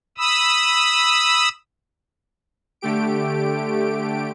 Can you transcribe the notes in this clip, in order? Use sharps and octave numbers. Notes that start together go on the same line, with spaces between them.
B5 D#6 E6
D3 A3 G4 D7